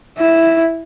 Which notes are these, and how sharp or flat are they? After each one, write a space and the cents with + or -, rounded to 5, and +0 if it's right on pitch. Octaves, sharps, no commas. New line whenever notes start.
E4 -5